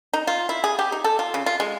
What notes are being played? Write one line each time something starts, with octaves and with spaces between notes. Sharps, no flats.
D#4
F4
E4
G#4
G4
D#4
A4
F4
C#3
F4
G#3